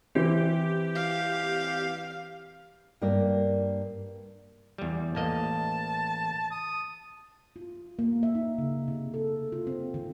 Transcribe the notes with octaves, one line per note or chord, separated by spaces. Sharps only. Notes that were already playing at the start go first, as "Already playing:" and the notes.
E3 C4 E4 G4 C5
F5
G2 A#3 A#4 D5
E2 G3
A1 A#3 D#5 A5
D#6
F4
A#3
E5
D#4
C#3
C3
A4
F4
C4
D#3